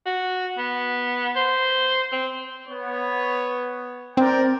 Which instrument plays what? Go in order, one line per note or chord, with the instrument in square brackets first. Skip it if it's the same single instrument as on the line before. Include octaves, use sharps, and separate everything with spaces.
[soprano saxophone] F#4
B3
C5
C4
[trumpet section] B3 C#5
[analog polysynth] C4 [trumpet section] A#4 D5 G5